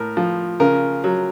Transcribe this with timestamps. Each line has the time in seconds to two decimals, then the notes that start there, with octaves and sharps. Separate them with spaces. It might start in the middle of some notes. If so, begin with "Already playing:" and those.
Already playing: A2 A#4
0.17 F3
0.60 C#3 A#4
1.04 F#3